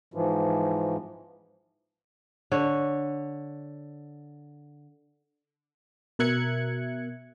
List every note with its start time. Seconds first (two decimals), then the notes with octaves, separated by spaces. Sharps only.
0.14 G#2 E3 F3
2.52 D3 C#5
6.19 B2 A#4 E5 F#6 G#6 C#7